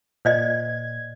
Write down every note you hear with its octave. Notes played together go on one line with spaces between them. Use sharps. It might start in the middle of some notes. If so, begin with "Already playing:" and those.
A#2 C5 D5 D#5 G#6